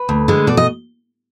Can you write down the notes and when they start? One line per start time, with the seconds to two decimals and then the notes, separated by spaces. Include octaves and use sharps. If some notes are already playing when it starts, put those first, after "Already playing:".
Already playing: B4
0.09 D2
0.28 D3 G#3
0.47 B2 D5
0.57 D#5